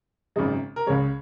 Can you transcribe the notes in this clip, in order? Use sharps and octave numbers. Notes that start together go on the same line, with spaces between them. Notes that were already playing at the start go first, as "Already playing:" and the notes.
G#1 F#2 C#3 G#3 D#4
A#4
C#2 C#3 G#3 C#5